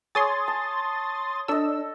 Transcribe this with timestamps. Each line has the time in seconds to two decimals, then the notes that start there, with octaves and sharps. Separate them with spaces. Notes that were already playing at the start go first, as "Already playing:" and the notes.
0.15 G#4 C#5 C6 D#6 A6
0.48 A5
1.48 D4 A4 D#5 E6